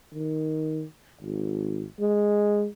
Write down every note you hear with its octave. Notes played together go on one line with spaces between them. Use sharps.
D#3
G#1
G#3